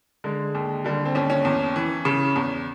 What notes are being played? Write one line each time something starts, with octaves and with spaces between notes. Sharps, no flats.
D3 G#3
D#2
D3 G3
C4
D#2 C#4
C#4
E2
E3
C#3
E2